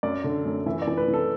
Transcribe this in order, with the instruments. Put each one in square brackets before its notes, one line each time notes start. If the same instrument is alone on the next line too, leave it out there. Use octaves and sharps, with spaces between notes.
[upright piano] F#2 D5
D3
F#2
E3 E5
D5
E3
B4
E3
A4